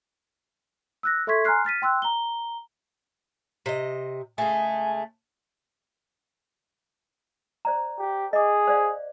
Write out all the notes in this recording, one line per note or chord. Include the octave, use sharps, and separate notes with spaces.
E6 F#6 A#6
A4 E5 C6 C#6 G#6 B6
G#5 A#5 C6 F6 F#6 C7
F6 A6 B6 D#7
G5 C6 E6 F#6
A#5 G7
C3 D#5
C#3 G#3 A3 G#5
C5 D5 A#5
G4
G#4 D#5 D6
C5 D5 F5